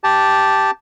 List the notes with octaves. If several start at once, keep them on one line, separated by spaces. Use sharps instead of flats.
G4 A5